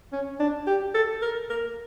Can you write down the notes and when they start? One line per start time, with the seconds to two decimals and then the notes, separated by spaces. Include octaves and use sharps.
0.13 C#4
0.40 D4
0.67 G4
0.94 A4
1.22 A#4
1.50 A#4